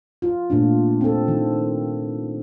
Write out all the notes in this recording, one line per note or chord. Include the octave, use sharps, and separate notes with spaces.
F4
A#2 A3 D4
C4 A4
D#3